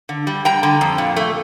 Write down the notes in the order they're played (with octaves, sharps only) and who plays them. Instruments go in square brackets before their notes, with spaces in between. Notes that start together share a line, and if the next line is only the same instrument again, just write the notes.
[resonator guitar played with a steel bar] D3
G3
G3 G5 A#5
D3
F2
A#2
A3